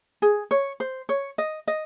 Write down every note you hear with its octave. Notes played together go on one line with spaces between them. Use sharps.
G#4
C#5
C5
C#5
D#5
D#5